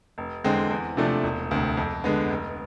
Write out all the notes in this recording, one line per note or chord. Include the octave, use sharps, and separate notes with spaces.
F1
E2 D3 G#3 C4
E2
C3 F3 A3 D4
E1
D2 C3
F2
D3 G#3 B3
F1